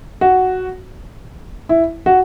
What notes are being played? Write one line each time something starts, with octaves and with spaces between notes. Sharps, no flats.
F#4
E4
F#4